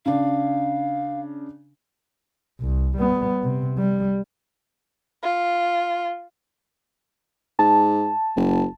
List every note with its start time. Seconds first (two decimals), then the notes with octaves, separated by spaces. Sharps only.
0.06 C#3 D4 F5
2.60 C2
2.97 G3 B3
3.43 C3
3.78 G3
5.23 F4
7.59 G#2 A5
8.37 F#1